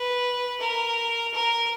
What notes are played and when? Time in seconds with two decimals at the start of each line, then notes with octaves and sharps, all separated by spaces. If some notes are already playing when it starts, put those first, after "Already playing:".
Already playing: B4
0.60 A#4
1.34 A#4